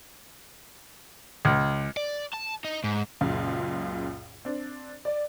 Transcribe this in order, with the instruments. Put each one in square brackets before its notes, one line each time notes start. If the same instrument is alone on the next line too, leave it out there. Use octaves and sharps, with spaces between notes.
[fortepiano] C#2
[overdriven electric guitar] D5
A5
D#4
G#2
[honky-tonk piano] C#2 F#2 A#2 C#3
C4 D4
D5